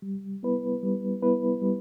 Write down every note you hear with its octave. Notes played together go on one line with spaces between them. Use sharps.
G3
B3 E4 B4
G3
B3 E4 B4
G3